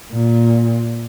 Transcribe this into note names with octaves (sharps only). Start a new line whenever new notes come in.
A#2